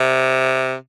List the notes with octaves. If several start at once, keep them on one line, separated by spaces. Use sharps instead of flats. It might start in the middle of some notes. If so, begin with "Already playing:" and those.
Already playing: C3